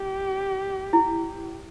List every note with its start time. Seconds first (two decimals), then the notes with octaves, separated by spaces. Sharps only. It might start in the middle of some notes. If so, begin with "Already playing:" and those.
Already playing: G4
0.93 E4